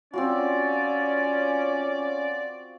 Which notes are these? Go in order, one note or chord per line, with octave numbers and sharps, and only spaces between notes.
C4 C#4 F4 F#4 D5